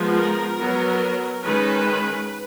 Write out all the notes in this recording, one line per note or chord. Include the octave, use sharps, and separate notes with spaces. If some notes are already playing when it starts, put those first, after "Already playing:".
Already playing: F3 G#3 B3
A#4
F#3 B3
D#3 G#3 C#4 B4